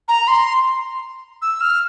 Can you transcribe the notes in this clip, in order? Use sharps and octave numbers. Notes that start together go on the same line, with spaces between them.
A#5
C6
E6
F6